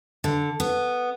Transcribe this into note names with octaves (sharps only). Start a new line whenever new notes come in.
D3
B3